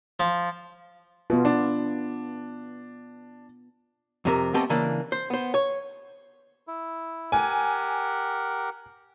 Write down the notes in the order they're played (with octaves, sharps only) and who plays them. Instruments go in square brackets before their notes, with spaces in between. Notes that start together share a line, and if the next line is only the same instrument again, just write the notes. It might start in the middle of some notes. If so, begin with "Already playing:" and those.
[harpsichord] F3
[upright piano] B2 [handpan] B3 F4
[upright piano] D4
[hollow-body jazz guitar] F2 C3 A#4
A3 B3 C4 G4 D#5 A5
C#3 E3 A#3 D4
C5
B3 C5
C#5
[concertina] E4
[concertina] G4 A#4 F#5 [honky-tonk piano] G#5